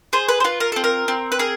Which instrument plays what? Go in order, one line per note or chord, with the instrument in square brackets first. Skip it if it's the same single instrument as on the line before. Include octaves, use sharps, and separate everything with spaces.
[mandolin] G#4 C5
B4
C5
F4 B4
A#4
C4 A4
A#4
C4
B4
G#4 A#4